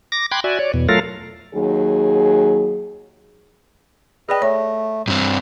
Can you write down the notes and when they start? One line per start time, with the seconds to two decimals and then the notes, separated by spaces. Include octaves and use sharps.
0.12 D6 A#6
0.31 G5 B5 C6 D6 F#6 G#6
0.44 F#4 D5 E5 G#5
0.59 C#5 D5
0.74 E2 B2
0.89 F#3 A3 F4 A4 A#4 F5
1.55 D#2 F#3 G#4
4.29 G#4 B4 D5 D#5 G5
4.42 A3 C#5
5.08 G2 C4